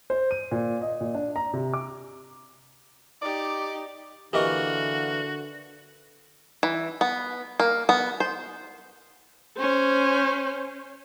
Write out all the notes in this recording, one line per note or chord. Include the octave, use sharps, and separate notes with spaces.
C5
D#7
A#2
D#5
A#2
D4
A#5
C3
D6
D#4 G4 D5
D3 E3 A#3 F#4 G4 A#4 D#5 C#6
E3
B3
A#3
B3
C5
C#4 C5